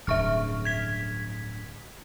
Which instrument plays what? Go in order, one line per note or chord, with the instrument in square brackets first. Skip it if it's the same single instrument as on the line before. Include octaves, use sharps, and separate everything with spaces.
[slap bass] D1 G2 C#3 [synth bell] E5 C#6 F6
[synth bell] G#6 B6